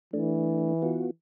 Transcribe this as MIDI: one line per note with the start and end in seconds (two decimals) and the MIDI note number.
0.13 1.10 52
0.13 0.73 57
0.13 0.73 62
0.82 1.11 59
0.82 1.11 65
0.82 1.11 66